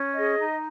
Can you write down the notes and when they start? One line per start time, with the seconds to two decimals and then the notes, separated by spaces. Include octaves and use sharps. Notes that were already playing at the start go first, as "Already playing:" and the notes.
Already playing: C#4
0.14 G#4 D#5
0.38 D#4